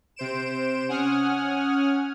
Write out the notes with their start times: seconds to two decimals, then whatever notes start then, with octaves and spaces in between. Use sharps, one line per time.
0.16 C3 C5 D7 E7
0.89 C#4 F#5 G#5 D#6 F6